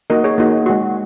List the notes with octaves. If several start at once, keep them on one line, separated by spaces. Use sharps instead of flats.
A#3 D#4 F#4 A#4 D#5
G#4 C#5
A#3 D#4 F#4
G#3 F#4